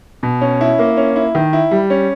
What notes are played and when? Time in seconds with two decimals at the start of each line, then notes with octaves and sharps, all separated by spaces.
0.23 B2
0.41 C#4
0.61 E4
0.79 A#3
0.97 C#4
1.16 E4
1.35 D#3
1.53 E4
1.71 G3
1.90 C#4